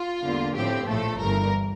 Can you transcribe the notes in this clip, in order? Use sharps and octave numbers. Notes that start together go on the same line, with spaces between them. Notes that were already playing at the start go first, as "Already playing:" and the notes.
Already playing: F4
E2 D3 G3 A#3
A2 F3 C4 G4
A#1 A2 F3 A3 A4
G1 G2 E3 A#4